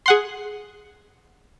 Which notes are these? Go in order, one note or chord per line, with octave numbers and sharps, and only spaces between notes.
G#4 F#5 C6